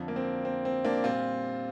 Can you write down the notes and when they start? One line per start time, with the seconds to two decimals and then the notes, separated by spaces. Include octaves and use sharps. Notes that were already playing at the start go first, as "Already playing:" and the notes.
Already playing: F2 D3 F3
0.08 A#3
0.16 C4
0.45 C4
0.65 C4
0.85 A#3 D4
1.04 A#2 G3 C4 F4